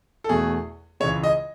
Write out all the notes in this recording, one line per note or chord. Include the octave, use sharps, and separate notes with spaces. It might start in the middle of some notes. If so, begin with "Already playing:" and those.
A4
E2 B2 A3 G#4
C#2 C#3 E3 G#3 C#5
D#5